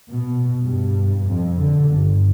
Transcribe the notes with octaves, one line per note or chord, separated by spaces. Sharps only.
B2
G2
F2
D3
G1